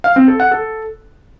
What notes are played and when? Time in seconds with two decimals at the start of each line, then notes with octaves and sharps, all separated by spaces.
0.04 F5
0.16 C4
0.28 A4
0.40 F#5
0.51 A4